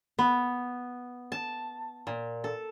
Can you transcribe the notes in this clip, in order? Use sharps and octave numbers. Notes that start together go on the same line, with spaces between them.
B3
A5
A#2
A4